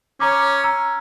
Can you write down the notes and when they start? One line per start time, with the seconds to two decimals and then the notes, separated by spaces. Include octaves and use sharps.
0.20 C#4 C#5 A#5 D6
0.64 A#5 E6